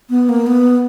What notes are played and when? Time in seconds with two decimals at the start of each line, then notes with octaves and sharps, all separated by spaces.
0.10 B3
0.29 A#3
0.47 B3